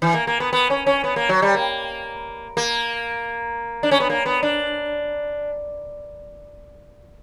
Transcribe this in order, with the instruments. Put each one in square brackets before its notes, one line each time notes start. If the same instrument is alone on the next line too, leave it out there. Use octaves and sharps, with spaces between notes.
[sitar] E3
A#3
A#3
B3
B3
C#4
C#4
B3
A#3
F#3
G3
A#3
A#3
D4
C#4
B3
A#3
B3
D4